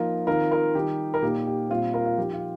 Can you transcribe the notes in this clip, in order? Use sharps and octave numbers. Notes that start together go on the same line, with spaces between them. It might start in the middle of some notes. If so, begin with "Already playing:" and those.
Already playing: F3 A#3 D#4 F4 A#4
D#3 C4 D#4 F4 A#4
F4 A#4
D#3 G3 D#4 G4
A#4
A#2 A#3 D#4 G4
G4
A#2 G3 C4 F4
F4 A#4
F4
F3 D#4 G4
F4